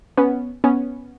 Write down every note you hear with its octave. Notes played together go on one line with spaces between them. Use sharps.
B3 C#4
B3 C#4